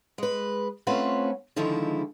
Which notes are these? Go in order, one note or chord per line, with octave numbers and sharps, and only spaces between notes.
G#3 B4
A3 C4 C#4 F4 B4 F#5
D3 D#3 F3 G#3 E4 F4